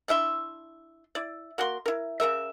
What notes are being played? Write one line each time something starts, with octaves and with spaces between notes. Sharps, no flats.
D4 E4 E5 C6
E4 D5
A#3 F#4 A#4 C6
E4 A#4
C#3 A#3 A#4 E5